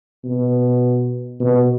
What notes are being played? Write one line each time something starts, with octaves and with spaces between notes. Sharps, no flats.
B2
B2